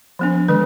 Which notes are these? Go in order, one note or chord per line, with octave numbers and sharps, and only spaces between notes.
F3 B3 D4
D#3 G#3 B4